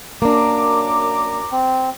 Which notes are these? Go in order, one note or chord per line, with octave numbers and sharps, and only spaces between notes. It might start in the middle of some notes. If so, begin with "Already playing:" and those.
F#2 A#3 D4 A#5 D6
C4